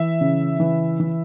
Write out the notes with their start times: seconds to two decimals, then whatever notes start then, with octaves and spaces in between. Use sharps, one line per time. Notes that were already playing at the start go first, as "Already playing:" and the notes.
Already playing: E3 E5
0.21 C#3
0.60 E3
1.00 E3